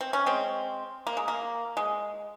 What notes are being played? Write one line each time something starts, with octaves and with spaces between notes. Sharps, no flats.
C4
C#4
G#3 C4
A#3
G#3
A#3
G#3